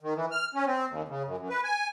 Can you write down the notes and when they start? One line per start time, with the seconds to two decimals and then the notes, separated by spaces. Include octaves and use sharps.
0.01 D#3
0.16 E3
0.31 F6
0.54 C#4
0.66 C4
0.89 D#2
1.08 C#3
1.25 F#2
1.38 F#2
1.49 B4
1.64 G#5